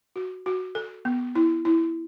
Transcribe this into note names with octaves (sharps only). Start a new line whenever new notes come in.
F#4
F#4
A4
B3
E4
E4